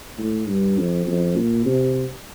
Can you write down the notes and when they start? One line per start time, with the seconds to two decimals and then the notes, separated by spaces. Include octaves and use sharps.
0.19 A2
0.48 G2
0.78 F2
1.07 F2
1.36 A#2
1.66 C3